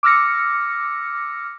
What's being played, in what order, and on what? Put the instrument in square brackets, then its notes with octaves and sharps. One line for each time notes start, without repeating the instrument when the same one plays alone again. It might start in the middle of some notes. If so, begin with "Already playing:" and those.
[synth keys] D6 E6 F6 A#6 C#7